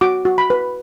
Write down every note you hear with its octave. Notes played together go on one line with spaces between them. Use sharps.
F#4 D6
F#4
B5
B4